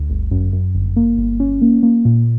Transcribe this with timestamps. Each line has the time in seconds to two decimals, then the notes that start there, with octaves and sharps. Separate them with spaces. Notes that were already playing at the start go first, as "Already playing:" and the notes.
Already playing: D2
0.10 G1
0.31 F#2
0.53 F#2
0.75 G1
0.96 A#3
1.18 G1
1.40 C#4
1.62 A#3
1.83 A#3
2.05 A#2